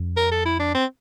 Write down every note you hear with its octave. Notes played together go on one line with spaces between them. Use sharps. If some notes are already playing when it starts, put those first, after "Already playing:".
Already playing: F2
A#4
A4
E4
D4
C4